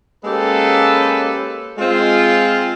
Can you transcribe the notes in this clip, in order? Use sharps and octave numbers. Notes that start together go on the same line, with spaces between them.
G#3 A#3 C#4 G4 A4 B4
G#3 C4 F4